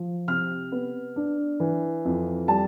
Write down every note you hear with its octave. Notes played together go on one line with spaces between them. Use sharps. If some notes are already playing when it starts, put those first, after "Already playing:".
Already playing: F3
C3 F6
B3
D4
E3
F2
G3 A5